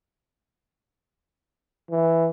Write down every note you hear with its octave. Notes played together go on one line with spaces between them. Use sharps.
E3